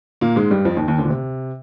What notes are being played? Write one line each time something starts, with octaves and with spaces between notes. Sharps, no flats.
A#2 A#3
G#2 G#3
G2 G3
F2 F3
D#2 D#3
D#2 D#3
D2 D3
A#2
C3